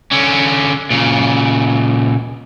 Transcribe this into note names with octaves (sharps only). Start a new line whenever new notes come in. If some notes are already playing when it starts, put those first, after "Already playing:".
D3 C#4
A#2 C#3